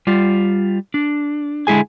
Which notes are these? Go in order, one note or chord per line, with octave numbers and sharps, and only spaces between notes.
G3 F4
D4
D3 G#3 E4 G#4 G#5